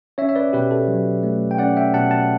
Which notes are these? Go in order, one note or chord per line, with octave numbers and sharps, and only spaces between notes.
C#4 C#5 E5
E5
B4 D5
B2 G4 B4
A4
F#3
A3
G5
C#4 D5 F#5
E5 G5
B2 F#5 A5
F#5 A5